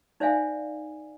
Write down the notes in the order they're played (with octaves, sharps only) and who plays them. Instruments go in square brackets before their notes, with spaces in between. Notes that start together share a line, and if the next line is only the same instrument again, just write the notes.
[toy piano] D#4 C5 D5 E5 F5 G#5